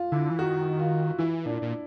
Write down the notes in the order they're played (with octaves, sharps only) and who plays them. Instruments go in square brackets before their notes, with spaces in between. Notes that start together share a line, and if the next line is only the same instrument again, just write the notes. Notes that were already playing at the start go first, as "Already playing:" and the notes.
Already playing: [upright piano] F4
[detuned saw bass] D3 [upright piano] E4
[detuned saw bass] E3
[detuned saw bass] D#3 [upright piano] F#4
[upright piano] F4
[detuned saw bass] E3 [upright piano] E4
[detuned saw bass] A#2 [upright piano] D4
[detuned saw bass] A#2